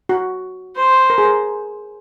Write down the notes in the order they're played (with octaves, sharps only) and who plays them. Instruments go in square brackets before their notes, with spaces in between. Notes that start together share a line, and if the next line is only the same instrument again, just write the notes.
[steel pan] F#4
[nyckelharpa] C5
[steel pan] A#4
G#4
A#4